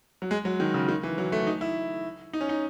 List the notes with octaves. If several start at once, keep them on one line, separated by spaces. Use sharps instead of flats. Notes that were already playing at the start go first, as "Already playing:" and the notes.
F#3
G#3
F#3
D#3
C#3
D#3
E3
F#3
A3
D#4
E4
D#4
C#4
D#4